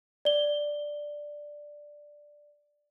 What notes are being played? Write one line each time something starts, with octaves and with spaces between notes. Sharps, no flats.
D5 G7